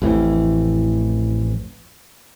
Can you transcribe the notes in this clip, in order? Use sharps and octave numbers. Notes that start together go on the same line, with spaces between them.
A1 F2 A2 E3